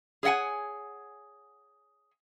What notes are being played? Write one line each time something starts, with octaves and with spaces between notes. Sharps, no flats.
G#4 C#5 D#5 F#5 G#5